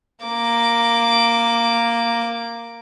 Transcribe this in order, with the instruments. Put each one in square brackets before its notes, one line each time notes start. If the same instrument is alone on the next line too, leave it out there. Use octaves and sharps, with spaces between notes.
[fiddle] A#3 D6